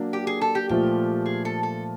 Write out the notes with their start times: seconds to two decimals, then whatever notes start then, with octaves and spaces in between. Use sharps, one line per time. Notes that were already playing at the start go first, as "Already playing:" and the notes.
Already playing: F#3 A#3 D4
0.13 G4
0.27 G#4
0.41 A4
0.55 G4
0.69 A#2 F3 A3 G4
1.26 G#4
1.45 A4
1.63 A4